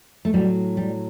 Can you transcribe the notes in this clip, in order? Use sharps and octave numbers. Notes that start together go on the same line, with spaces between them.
A3
A2 F#3 G3
G3